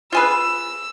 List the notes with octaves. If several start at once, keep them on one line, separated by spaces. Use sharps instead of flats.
F4 G#4 B4 E6